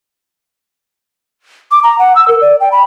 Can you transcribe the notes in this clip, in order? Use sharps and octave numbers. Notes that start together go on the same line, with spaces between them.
D6
A#5
F#5
E6
A#4
D5
G5
B5